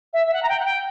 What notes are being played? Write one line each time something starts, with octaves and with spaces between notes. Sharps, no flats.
E5
E5
F#5
A#5
G5
F#5
G5